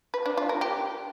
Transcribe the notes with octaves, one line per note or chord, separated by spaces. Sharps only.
B4
D4
F4
A#4
G4